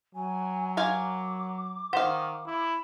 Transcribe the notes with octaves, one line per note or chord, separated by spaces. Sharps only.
F#3 G#5
A#4 F5 G#5 D6
D#3 C5 F5 F#5
E4